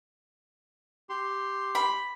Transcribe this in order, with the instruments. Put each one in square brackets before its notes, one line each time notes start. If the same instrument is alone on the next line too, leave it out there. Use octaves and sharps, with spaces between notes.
[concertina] G4 C6
[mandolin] B5